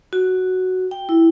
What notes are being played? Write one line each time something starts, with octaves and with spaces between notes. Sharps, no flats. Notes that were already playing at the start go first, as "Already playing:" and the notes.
F#4
G5
E4